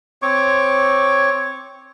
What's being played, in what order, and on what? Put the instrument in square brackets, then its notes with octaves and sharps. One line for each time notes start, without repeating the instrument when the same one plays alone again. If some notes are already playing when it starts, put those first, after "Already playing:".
[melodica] C4 C#5 C#6 D6